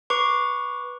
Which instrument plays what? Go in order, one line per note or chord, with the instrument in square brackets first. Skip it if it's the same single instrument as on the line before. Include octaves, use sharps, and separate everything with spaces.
[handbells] B4 C#6 D6